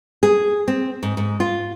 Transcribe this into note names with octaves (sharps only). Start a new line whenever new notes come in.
G#4
C4
G#2
G#2
F4